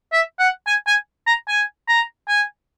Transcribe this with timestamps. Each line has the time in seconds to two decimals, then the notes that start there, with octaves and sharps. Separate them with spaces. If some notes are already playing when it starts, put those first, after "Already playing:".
0.12 E5
0.39 F#5
0.67 G#5
0.87 G#5
1.27 A#5
1.48 G#5
1.88 A#5
2.29 G#5